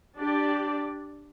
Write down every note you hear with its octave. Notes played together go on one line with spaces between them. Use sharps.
D4 G4 D5